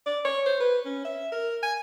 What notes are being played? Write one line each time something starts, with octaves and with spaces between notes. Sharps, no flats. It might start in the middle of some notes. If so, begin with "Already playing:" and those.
D5
C#5
C5
B4
C#4
E5
A#4
G#5